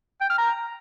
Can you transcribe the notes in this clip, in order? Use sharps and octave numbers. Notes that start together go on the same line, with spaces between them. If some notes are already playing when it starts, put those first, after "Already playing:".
G5
F6
A#5